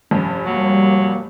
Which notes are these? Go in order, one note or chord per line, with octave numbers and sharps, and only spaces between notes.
F1 G2 C#4
F#3 G3 A#3